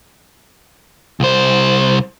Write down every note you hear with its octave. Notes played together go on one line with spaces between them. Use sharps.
C2 C5